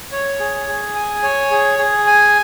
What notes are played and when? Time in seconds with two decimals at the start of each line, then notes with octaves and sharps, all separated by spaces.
0.12 C#5
0.40 G#4
0.67 G#4
0.95 G#5
1.23 C#5
1.51 G#4
1.79 G#4
2.07 G#5